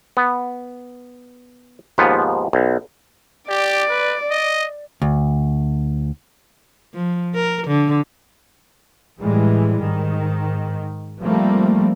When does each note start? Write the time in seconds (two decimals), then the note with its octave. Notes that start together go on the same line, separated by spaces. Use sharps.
0.17 B3
1.98 D#2 G#2 F3 B3
2.53 B1
3.49 G4 D5
3.89 B4
4.30 D#5
5.02 D2
6.94 F3
7.35 A#4
7.68 D3
9.20 A2 E3 G3 G#3
9.80 G#2 D#3
11.20 F3 G3 A3 A#3 C4